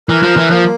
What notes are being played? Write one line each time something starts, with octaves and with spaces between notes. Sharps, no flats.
E3 A#4
F3
E3
F3 A#3